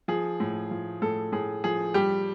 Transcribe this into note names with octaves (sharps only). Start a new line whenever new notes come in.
F3 G#4
A2
F3
A2 A4
A2 G#4
F3 G#4
G3 G4